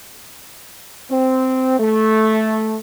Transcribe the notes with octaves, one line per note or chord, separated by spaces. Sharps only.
C4
A3